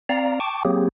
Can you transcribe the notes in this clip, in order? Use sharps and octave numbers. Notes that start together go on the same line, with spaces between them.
C4 D5 F5 A#5
G5 A5 C#6 D6
F#3 A#3 C4 G4 G#4